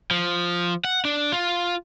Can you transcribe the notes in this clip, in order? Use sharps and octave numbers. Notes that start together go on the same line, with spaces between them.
F3
F#5
D4
F4